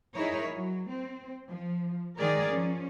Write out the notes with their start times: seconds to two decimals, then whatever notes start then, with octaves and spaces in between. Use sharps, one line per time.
0.14 D#4 E4 G#4 A#4 C#5
0.49 F#3
0.90 C4
1.49 F3
2.18 D#3 G#3 G#4 A#4 D5
2.51 F3 C#4